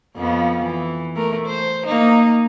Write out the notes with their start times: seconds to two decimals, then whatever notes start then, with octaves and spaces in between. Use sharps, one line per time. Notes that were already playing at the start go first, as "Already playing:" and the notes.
0.16 F2 F3 B3
0.64 E3
1.16 A3 A#4
1.47 C5
1.86 A#3 D#4